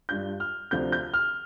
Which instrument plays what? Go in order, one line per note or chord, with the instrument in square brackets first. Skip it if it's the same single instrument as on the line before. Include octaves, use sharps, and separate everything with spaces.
[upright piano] G2 G3 D4 F4 G6
F6
D2 C3 F3 D4 F4 G6
G6
F6